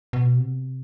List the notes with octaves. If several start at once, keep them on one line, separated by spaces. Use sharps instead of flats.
B2
C3